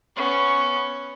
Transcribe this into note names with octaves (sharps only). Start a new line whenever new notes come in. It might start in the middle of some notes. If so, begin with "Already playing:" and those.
B3 C#4